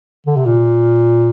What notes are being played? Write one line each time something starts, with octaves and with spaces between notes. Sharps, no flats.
D3
C3
A#2